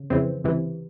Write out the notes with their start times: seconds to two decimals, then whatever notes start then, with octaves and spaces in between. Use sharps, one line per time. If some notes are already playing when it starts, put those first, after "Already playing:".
Already playing: C#3
0.10 F2 C#3 E3 C4
0.44 C#2 C3 E3